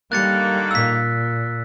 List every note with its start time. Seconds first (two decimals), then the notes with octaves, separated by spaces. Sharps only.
0.12 D3 D#3 G3 A#3 F#6 A6 C#7
0.71 A#2 E6 B6